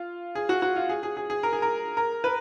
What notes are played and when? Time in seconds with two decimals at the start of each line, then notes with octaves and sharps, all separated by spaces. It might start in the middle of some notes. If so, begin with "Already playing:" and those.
Already playing: F4
0.35 G#4
0.49 F#4
0.62 F#4
0.76 F4
0.89 G#4
1.03 G#4
1.17 G#4
1.30 G#4
1.43 A#4
1.53 G#4
1.62 A#4
1.97 A#4
2.24 B4